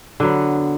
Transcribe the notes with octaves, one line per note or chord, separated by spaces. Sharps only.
D3 F#3 B3